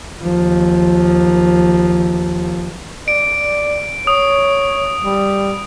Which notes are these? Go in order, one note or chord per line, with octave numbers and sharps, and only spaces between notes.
D#2 F3
D5 D7
C#5 D#6
G3